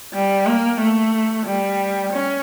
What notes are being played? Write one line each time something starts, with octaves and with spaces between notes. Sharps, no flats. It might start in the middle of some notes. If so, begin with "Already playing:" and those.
G3
A#3
A3
G3
C#4